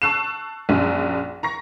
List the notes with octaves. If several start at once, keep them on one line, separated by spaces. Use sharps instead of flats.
A5 C#6 E6 F#6 C7 E7
A#1 F#2
A#5 C#6 A#6